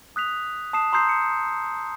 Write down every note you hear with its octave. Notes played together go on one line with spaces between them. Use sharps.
D#6 F#6 B6 F7
A5 D#6 C7 E7
A#5 C6 D#6 E6 G6 C7
C#7